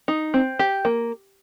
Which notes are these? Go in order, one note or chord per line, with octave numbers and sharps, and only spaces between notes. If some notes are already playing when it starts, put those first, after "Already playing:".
D#4
C4
G4
A#3